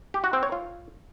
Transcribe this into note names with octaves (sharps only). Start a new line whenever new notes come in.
G4
F#4
C4
C#5
F4